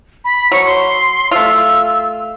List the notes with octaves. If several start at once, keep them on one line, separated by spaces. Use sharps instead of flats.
B5
F#3 C#6
C6
A3 F4 E6